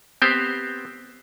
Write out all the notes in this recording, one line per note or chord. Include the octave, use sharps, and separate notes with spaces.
B3 C4 G4 C5